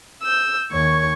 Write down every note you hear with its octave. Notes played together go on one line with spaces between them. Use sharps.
E6 G6
D#2 C#5 C#6 G#6